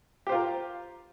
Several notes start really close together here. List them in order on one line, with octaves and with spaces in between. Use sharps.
G4 C5 F4 A#4